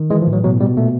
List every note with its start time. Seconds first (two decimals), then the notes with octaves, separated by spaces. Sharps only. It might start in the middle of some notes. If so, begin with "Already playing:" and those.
Already playing: D#3
0.10 E3 G#3
0.21 F3
0.27 A2
0.33 F#3
0.44 B2 F#3
0.60 B2 G3
0.77 A#2 A3